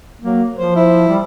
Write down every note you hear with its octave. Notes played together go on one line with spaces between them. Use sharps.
F#3 A#3
F3 C5
E4
G3